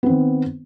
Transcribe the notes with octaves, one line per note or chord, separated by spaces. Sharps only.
D#3 B3 C4